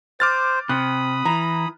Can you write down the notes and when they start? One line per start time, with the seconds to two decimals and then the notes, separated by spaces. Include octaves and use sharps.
0.20 C5 D6 F6 A6
0.69 C3 B5 D#6 F#6
1.26 E3 A#5